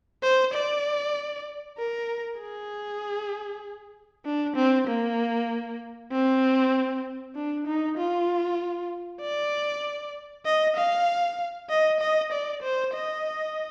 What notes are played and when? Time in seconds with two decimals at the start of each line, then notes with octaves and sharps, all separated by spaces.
0.23 C5
0.53 D5
1.78 A#4
2.39 G#4
4.25 D4
4.56 C4
4.88 A#3
6.12 C4
7.36 D4
7.67 D#4
7.98 F4
9.21 D5
10.46 D#5
10.76 F5
11.70 D#5
12.00 D#5
12.32 D5
12.63 C5
12.94 D#5